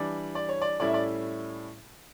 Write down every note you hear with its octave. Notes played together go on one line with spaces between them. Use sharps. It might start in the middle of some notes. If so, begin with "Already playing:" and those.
Already playing: E3 G3 D4 D5
D5
C#5
D5
A2 G3 C#4 E4 D5
E5
D5